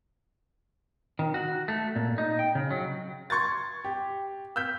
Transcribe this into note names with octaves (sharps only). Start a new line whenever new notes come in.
D#3
F#4
A3
A#2
D#4
G5
C#3
F#3
C6 C#6 G#6 A6
G4
E6 F6 G6 B6